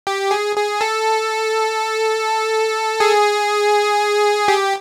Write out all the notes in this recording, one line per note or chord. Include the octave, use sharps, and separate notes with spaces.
G4
G#4
G#4
A4
G#4
G4